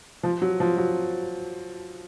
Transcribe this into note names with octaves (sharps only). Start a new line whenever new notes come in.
F3
F#3
F3
F#3